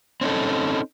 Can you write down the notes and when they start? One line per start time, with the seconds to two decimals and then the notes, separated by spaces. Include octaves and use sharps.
0.21 C4 C#4 D#4 A4